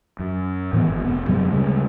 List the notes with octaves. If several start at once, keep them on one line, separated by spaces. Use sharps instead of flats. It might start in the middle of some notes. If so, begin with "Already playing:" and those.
F#2
A2 D#3 E3 B3
G1
F1 B3
F#2 C3 F#3 G3
D2 C#3 G3 G#3